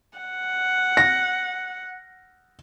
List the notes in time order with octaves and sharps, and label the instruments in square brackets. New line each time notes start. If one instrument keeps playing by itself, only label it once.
[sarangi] F#5
[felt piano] A#6